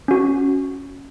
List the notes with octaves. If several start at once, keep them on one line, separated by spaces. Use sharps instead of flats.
C#4 F#4